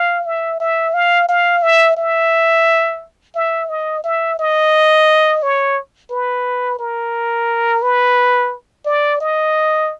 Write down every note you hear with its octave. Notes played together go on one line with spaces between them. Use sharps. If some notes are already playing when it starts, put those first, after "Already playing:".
Already playing: F5
E5
E5
F5
F5
E5
E5
E5
D#5
E5
D#5
C#5
B4
A#4
B4
D5
D#5